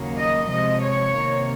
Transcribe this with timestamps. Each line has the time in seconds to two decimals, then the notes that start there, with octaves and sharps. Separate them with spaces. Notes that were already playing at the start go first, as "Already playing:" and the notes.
Already playing: D#2 C#3 F#3 A#3
0.16 D#5
0.48 C3 F3 G#3 D#5
0.81 C#5
1.13 C3 D#3 A#3